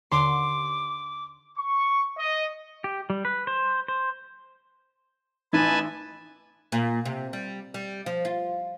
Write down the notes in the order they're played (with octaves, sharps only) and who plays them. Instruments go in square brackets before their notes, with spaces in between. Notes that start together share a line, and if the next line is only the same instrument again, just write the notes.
[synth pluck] D#2 D3 [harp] C6 [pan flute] D6
[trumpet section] C#6
D#5
[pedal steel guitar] G4
G3
B4
C5
C5
[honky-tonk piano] A1 E3 D#4 [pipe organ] B4 G#5 A5
[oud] A#2
C3
G3
G3
F3
F4